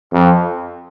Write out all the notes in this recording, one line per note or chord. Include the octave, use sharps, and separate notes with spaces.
F2